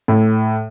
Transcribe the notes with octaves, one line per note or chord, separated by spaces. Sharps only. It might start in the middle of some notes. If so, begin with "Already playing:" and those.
A2